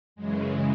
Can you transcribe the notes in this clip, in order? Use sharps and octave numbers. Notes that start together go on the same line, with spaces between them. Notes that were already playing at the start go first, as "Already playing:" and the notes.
F#2 C#3 E3 G#3